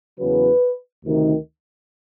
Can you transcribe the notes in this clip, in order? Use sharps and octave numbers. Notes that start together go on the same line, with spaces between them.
E2 C#3 F#3 B4
D2 C3 D#3